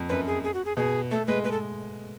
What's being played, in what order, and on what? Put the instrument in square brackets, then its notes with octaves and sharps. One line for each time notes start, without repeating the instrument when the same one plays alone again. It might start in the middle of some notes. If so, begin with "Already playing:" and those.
Already playing: [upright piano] F2
[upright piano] F#2 [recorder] B4
[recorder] G#4
G#4
F#4
G#4
[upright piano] B2 [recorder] G#4
[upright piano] A3 [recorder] A4
[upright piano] G#3 [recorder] B4
[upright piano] G#3 [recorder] B4
[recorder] A4